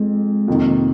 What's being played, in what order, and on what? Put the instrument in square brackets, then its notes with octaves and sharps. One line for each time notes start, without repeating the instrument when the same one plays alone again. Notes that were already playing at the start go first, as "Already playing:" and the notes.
Already playing: [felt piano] F2 [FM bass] G#3
[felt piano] F2 C3 D#3 [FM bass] A#3